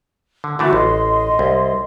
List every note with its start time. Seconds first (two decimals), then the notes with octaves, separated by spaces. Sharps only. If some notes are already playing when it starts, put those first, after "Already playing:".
0.44 D3
0.59 D3 E3 A3 E4 F#4 D6
0.73 A1 D#5 C6
1.39 C2